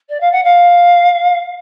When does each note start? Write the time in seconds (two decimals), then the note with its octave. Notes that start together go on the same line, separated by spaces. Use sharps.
0.09 D5
0.20 F5
0.32 F#5
0.44 F5